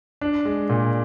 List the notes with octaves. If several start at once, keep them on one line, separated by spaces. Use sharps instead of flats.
D4
G#3
A#2